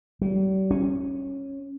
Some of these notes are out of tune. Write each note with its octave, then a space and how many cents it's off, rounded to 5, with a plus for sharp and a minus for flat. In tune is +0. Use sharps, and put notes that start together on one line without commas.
G3 -40
C#4 -10